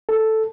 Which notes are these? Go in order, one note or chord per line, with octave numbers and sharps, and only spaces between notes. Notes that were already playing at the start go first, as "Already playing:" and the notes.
A4